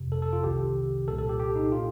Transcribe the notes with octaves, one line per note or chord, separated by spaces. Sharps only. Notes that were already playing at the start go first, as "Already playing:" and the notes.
Already playing: G1 F2 C3
A4
A4
F4
C2 C3 D#3 G4
C2 A#2 A4
A4
G4
G4
D#4
A#2 F4